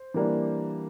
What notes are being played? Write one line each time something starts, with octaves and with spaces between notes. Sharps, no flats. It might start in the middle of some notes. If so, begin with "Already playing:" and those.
Already playing: C5
E3 G3 A#3 D4